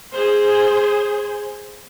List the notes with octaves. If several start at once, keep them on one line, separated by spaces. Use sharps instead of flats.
G#4 C5